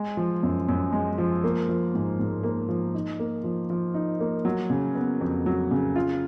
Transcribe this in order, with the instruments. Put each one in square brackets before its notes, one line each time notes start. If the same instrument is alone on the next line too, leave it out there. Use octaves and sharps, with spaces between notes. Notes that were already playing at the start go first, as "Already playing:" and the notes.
Already playing: [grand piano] G#3
F3
F#2
F#2
G#3
F3
A#3
F3
G#2
G#2
A#3
F3
D#4
A#3
F3
F3
D#4
A#3
F#3
C#3
B3
F2
F#3
C#3
F4